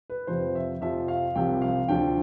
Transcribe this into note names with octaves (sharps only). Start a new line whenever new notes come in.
B4
F2 C3 F3 C5
E5
F2 C3 F3 E5
F5
C2 C3 F3 G5
F5
D2 D3 F3 G5